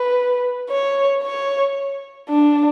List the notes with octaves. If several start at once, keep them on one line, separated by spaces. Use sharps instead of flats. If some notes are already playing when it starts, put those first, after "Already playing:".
Already playing: B4
C#5
C#5
D4